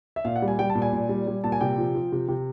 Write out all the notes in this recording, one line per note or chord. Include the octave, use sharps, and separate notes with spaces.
E5
A#2 F5
F#5
G3
G#5
G3 G5
A5
A#2
G#5
A#2
G3
G3
A#2 A5
G#5
C3 G5
F3
F3
C3
C3